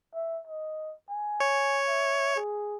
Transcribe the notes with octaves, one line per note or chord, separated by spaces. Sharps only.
E5
D#5
G#5
C#5
E5
G#4